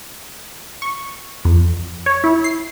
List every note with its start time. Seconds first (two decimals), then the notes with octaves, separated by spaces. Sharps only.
0.82 C#6
1.45 F2
2.06 C#5
2.24 E4
2.44 C7